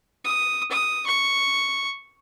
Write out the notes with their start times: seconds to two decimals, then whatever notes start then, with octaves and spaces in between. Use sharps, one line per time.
0.25 D#6
0.71 D#6
1.06 C#6